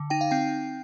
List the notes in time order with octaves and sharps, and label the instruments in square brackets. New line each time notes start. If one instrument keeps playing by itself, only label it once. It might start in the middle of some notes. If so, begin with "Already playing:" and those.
Already playing: [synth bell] D3
D#4 G5
F5
C4 G5